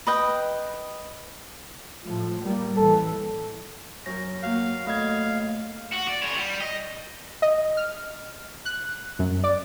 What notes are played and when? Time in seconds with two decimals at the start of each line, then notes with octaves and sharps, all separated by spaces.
0.07 B4 D#5 G5
2.04 A2 F3
2.42 G3 A#3
2.77 A1 E3 A4
4.06 F#2 A#4 A#6
4.43 A#3 F#4 F5
4.87 A3 D#5 F5 G#6
5.93 F#4
6.07 D5
6.22 E3 C#5
6.36 G3
6.61 D#5
7.42 D#5
7.77 F6
8.65 F#6
9.19 F#2
9.44 D5